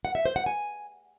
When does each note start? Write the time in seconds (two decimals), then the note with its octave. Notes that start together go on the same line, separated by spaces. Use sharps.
0.05 F#5
0.15 E5
0.25 C5
0.36 F#5
0.46 G#5